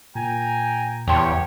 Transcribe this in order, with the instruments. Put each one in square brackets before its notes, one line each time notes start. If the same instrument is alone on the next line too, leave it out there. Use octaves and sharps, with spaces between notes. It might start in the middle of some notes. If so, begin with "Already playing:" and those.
[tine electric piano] A#2 [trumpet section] G5 G#5 A#5
[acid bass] E2 [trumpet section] G4 C#5 [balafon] G5 A5 C6